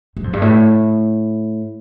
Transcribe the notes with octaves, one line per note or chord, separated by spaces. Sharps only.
G2
F2
G2
A2